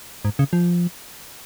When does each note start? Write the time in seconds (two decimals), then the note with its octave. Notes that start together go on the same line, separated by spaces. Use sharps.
0.25 G#2
0.39 C#3
0.53 F3